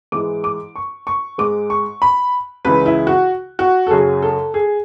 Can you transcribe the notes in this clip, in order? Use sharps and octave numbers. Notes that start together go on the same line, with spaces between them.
G#2 E3 G#3 D6
D6
C#6
C#6
G#2 G#3 D6
C#6
B5
C#2 C#3 E3 G#3 B4
E4
F#4
F#4
A4
F#2 C#3 F#3 G#4
A4
G#4